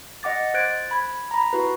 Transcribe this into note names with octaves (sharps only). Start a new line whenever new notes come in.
D#5 F#5 D6 A6
C5 F#6 G#6 A6 D7
B5 G#6
A#5 B5
E4 F#4 B4